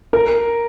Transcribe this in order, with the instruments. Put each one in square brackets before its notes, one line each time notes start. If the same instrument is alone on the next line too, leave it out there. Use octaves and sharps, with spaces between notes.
[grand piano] A#4